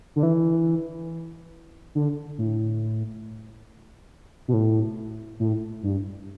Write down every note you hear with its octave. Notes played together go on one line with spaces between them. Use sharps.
D3
E3
D3
A2
B2
A2
A2
G2